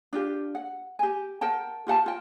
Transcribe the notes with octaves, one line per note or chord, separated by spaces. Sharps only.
D4 F4 G4
F#5
G4 G#5
A#4 F#5 G5 A5
F4 G4 F#5 A5
F4 G5